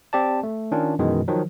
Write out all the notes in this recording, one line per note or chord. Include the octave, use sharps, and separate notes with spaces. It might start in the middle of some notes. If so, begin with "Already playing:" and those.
C4 G4 D5 A5
A3
D#3 C#4 D4 F4
F#2 B2 D#3 E3 G#3
D#3 F3 F#3